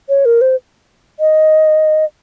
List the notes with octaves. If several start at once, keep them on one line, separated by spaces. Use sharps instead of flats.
C#5
A#4
C5
D#5